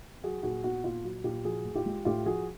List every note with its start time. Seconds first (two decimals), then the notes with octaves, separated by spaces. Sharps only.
0.24 F#3 F#4 G#4
0.43 A#2 F#4 G#4
0.64 B3 F#4
0.84 A#2 F4
1.04 F#3 F#4
1.24 A#2 F4 G4
1.44 F3 F#4 G#4
1.65 A2
1.75 F4 G4
1.86 G#3
2.05 A2 F4 G4
2.26 F3 F#4 G#4